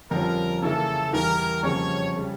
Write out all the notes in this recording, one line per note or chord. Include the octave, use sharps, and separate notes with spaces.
F2 D3 G3 C#4 F4 A#4
C#3 E3 A#3 E4 A4
E2 E3 G3 A#4
F2 C#3 G3 A#3 C#4 C#5
C#3 G3